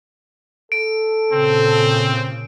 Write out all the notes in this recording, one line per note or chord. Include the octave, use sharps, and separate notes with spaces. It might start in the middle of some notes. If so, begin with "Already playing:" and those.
A4 D7
A#2 C#3 C4